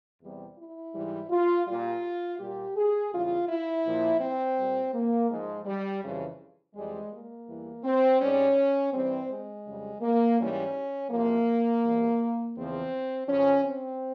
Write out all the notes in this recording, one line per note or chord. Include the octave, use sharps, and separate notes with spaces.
E2 C3 G3
E4
G#2 E3 G3
F4
A#2 G3 F4
A#2 G3 G4
G#4
E2 C#3 E3 G3 F4
E4
A#2 F3
C4
A#2 G3
A#3
G#2 F3 G#3
G3
F2 C#3 E3 G3
F2 E3 G3 G#3
A#3
E2 E3 G3
C4
G#2 G3 C#4
G2 E3 G3 C4
G#3
F2 C#3 G3
A#3
G#2 E3 G3 C#4
E2 C3 F3 A#3
E2 C3 E3 G3
E2 C#3 F3 C4
F2 C#3 F3 C#4
C4